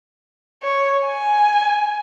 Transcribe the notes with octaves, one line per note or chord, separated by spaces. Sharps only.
C#5
G#5